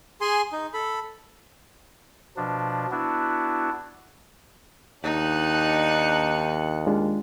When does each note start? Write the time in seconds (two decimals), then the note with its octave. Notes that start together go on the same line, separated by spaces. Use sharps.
0.21 G#4 G#5 C6
0.53 D#4
0.74 A4 B5
2.37 B2 F3 D4
2.91 B3 D4 E4 F#4
5.04 D#2 D4 D#4 F#6 C#7
6.87 G#3 D4 F4